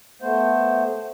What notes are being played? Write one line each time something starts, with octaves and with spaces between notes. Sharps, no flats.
A3 B3 C5